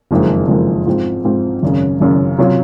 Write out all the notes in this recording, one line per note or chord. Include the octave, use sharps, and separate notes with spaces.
F#1 F2 D#3 G#3 C4
F#1 F2 D#3 G#3 C4
G#2 F3 C4
G#2 F3 C4
G#1 F#2 C#3
G#1 F#2 C#3
C3 F#3 C#4 F4